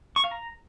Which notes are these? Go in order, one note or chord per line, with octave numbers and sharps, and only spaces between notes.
C#6
F5
A#5